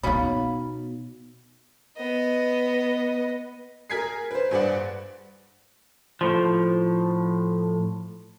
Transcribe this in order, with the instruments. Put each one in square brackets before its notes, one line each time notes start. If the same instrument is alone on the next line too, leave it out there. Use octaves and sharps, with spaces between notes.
[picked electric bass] B2 [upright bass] B3 D#4 [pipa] C#4 B5 [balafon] C#5 F5
[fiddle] B3 D#5
[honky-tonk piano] G#4 A#4 G#5 G#6 B6 C7
B4 C5
G2 G#4 B4 C5 D5 F#5
[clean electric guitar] A2 F3